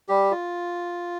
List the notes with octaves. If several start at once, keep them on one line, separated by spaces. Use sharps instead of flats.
G3 G4
F4